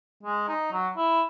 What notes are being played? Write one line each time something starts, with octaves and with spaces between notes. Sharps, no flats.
G#3
D#4
F#3
E4